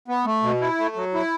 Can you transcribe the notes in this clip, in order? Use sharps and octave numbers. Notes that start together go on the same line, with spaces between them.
B3
A3
B2
E4
A3
F#3
E4